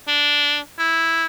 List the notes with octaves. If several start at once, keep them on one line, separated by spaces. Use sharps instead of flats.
D4
E4